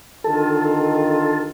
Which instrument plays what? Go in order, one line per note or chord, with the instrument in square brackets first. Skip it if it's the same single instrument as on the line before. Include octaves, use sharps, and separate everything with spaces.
[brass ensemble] D3 D#3 F4 [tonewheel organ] A4